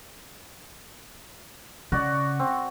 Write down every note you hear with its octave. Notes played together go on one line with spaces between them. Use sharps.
C#3 F#4 D5
C4